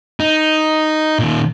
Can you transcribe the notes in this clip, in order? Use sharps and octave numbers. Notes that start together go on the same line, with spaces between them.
D#4
A#2 D#3